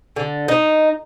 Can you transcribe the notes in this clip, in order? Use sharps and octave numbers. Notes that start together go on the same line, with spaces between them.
D3
D#4